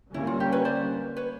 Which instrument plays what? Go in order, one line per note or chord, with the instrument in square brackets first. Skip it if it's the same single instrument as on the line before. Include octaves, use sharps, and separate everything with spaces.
[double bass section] D3 G3 A#3 C#4 [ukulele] E4
[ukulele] F4
G4
B4 C#5
C5 D5
B4 C#5